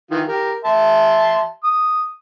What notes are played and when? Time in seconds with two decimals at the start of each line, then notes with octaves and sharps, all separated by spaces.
0.11 D#3 E3 F4
0.27 G4 A#4
0.65 E5 A5 C6
1.64 D#6